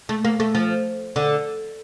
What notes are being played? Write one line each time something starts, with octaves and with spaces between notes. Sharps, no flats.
A3
A#3
A3
F3
D3